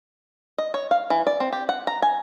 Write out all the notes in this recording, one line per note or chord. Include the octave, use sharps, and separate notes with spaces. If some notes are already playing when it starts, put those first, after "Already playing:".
D#5
C#5
F5
E3
D5
C4
G4
F#5
A#5
G#5